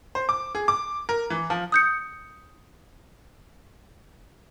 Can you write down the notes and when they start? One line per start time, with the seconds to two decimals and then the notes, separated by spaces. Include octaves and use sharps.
0.15 C5
0.29 D6
0.55 G#4
0.68 D6
1.09 A#4
1.30 E3
1.50 F3
1.72 D#6 G6 C#7